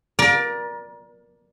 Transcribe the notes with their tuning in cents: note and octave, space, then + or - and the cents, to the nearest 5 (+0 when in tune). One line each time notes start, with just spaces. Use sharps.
A#4 +30 D5 +0